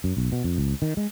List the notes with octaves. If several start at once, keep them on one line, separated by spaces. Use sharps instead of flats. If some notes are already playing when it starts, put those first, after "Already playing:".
F#2
B1
B2
F2
C#2
D#3
G#3